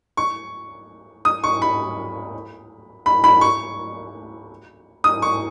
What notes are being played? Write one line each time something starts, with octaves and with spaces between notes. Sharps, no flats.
C#6
D#6
C#6
B5
B5
B5
C#6
D#6
C#6